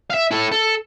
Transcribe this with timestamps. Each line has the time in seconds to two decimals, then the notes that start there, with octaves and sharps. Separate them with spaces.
0.11 E5 F5
0.31 E4 A4
0.52 A4